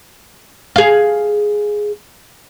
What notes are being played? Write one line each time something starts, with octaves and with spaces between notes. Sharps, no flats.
G#4 F5